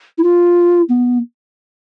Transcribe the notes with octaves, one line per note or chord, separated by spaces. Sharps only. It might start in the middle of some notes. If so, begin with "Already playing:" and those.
E4
F4
B3